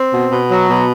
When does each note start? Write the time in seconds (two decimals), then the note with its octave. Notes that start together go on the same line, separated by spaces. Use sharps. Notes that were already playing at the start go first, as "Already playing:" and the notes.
Already playing: C4
0.12 B2
0.32 B2
0.51 F#3
0.70 B2